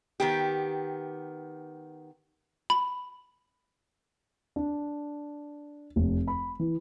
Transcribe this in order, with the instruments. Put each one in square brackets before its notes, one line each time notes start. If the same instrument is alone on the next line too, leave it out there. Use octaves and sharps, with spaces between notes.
[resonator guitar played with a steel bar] D#3 B3 G4
[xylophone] B5
[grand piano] D4
F1
B5
E3